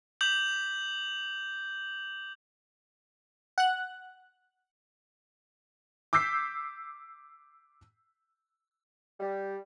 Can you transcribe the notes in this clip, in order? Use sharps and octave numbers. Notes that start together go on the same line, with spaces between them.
D6 G6 F#7
F#5 F#6
D6 E6 G6 B6 C7
G3